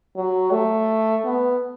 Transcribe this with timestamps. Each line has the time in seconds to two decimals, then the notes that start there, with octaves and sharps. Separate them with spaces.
0.16 F#3
0.51 A3
1.25 B3